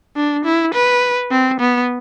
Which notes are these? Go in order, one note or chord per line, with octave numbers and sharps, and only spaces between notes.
D4
E4
B4
C4
B3